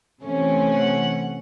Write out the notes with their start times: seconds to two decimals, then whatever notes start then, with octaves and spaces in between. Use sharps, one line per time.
0.21 C3 E3 A3 C#4
0.72 F#5